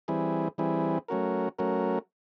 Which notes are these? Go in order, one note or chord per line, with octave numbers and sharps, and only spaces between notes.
E3 G3 C4 E4 G#4
E3 G3 C4 E4 G#4
F#3 A3 C#4 F#4 A#4
F#3 A3 C#4 F#4 A#4